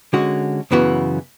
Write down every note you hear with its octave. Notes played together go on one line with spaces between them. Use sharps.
D3 G#3 C#4 F#4
F#2 C#3 E3 B3 F#4